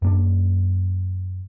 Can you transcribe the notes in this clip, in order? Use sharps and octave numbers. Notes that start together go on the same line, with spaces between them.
F#2 A#3 D4